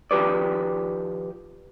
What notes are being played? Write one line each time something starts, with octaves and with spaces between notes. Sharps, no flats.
D#3 F3 G4 B4 D5